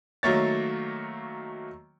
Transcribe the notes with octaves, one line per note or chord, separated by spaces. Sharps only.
D#3 F#3 A3 A#3 C#5 A6